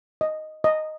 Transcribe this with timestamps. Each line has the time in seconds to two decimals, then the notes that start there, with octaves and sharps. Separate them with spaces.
0.21 D#5
0.64 D#5